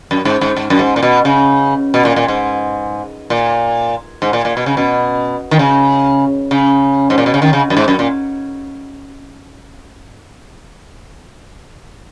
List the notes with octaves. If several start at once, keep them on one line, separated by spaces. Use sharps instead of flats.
F#2
G#2
G#2
G#2
F#2
G#2
A#2
B2
C#3
B2
A#2
A#2
G#2
A#2
G#2
A#2
A#2
B2
C#3
B2
D#3
C#3
C#3
G#2
A#2
B2
C#3
D#3
C#3
F#2
G#2
F#2
A#2